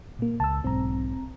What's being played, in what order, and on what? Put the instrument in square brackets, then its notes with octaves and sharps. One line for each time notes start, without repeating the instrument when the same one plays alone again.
[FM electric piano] A#2 A#3
[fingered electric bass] C#2 [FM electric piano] A5 E6
[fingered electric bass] B1 G#2 [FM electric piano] C4 A#5